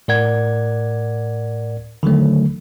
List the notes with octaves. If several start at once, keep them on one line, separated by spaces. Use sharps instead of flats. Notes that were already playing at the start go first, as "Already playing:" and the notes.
A2 A#4 D5 F#5 G#6
D3 D#3 F#3 A3